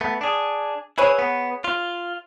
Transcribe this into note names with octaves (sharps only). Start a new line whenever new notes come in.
A3 B3
D4 G#4
E4 G#4 B4 C#5
B3
F4